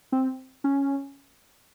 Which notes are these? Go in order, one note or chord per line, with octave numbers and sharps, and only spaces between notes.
C4
C#4